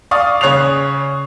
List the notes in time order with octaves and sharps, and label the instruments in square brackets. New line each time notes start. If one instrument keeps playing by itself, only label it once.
[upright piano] D5 F5 C#6 D#6
C#3 C#5 F#6 C7 F7